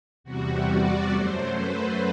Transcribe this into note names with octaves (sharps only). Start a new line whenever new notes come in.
E2 C3 G3 F#4
D5
F#2 F#3 A3 C5
B4